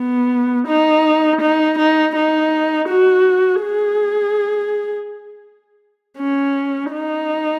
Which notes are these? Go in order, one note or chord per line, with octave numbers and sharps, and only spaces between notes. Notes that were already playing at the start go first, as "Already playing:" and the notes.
Already playing: B3
D#4
D#4
D#4
D#4
F#4
G#4
C#4
D#4